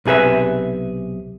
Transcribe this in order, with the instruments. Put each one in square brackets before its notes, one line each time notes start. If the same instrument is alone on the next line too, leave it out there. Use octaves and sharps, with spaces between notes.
[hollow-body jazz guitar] B1 C3 G#4 B4 E5